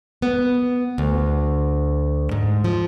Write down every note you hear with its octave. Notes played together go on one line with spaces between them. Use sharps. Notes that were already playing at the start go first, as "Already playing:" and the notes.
B3
D2
G#2
F3